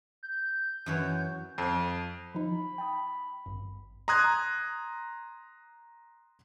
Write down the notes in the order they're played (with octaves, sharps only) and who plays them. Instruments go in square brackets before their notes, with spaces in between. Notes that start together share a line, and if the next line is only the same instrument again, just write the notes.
[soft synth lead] G6
[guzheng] F#2 E3 C#5
[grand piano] F2
[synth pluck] F3 D#4 [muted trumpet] B5
[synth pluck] G5 A5 D#6
G#1 G2
[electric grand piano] A#5 C6 D#6 F#6 G#6